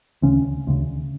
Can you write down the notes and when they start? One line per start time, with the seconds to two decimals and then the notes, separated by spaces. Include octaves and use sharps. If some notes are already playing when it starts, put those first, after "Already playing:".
0.22 D2 C#3 C#4
0.67 D2 C#3